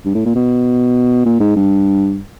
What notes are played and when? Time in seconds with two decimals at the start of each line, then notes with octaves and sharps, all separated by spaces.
0.05 G2
0.15 A2
0.25 A#2
0.35 B2
1.26 A#2
1.40 G#2
1.56 G2